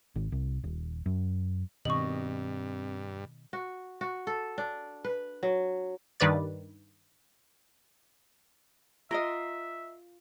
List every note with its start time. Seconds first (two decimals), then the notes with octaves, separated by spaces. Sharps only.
0.16 G#1
0.32 C2
0.64 D#1
1.06 F#2
1.85 G2 B2 D#3 C4 D#5 C#6 F#7
3.53 F#4
4.01 F#4
4.27 A4
4.58 D4
5.04 B4
5.43 F#3
6.20 G2 D#3 B4 D5 A6
9.11 F4 A#4 D#5 E5 C6